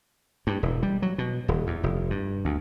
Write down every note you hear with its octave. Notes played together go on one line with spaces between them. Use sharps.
G2
E1
G3
F#3
B2
D#1
E2
F1
G2
D2